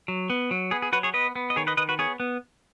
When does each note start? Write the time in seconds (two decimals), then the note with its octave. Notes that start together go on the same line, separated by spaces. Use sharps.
0.08 F#3
0.30 B3
0.51 F#3
0.71 B3 G#4
0.82 G#4
0.93 F#3 F#4 B4
1.03 G#4 C#5
1.14 B3 B4 D#5
1.36 B3
1.50 D#5
1.56 D#3 G#4 C#5
1.67 B4 D#5
1.77 D#3 B4 D#5
1.89 F#4 B4
1.99 B3 G#4 C#5
2.20 B3